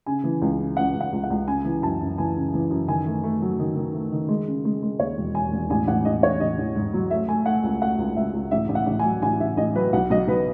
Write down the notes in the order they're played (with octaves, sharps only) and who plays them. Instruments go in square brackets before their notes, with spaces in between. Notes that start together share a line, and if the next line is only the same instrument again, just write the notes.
[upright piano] C#3 G#5
E3
C#2
C#3
C#2 F#5
C#2
F#5
C#2
F#5
C#2
C#3 G#5
E3
F#2 A5
F#2
E3 G#5
C#3
E3
F#2
D#3 G#5
A3
A3
F#3
D#3
D#3
A3
D#3
G#3
C#3
G#3
G#3
D#2 C#5
E1
E1 G#5
E1
A1 G#5
A1 F#5
A1 D#5
A1 C#5
A1 D#5
A1
G#2
F#3
A3 E5
A3 G#5
A3 F#5
C#2
A3 F#5
C#2
C#2 E5
C#2
A1 E5
A1
F#5
A1
G#5
F#3
A1 G#5
A1 E5
A1 D#5
F#3 B4
B1 F#5
B1 D#5
B1 B4